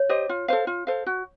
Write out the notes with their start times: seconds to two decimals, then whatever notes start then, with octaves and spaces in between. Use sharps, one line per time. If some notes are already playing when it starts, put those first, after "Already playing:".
Already playing: C#5
0.09 G4 C5 D#5
0.29 F4
0.48 A4 C5 F5
0.67 F4
0.87 A4 C5 F5
1.06 F#4